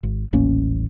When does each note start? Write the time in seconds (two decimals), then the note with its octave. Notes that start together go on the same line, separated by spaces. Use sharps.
0.03 G#1
0.33 D#1 A1 A#3 C#4